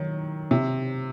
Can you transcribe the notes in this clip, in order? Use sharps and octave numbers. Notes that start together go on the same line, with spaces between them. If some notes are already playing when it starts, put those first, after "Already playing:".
Already playing: D#3 F#3
C3